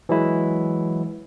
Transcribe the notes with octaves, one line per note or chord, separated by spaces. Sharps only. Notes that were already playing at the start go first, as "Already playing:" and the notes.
E3 F#3 G#3 E4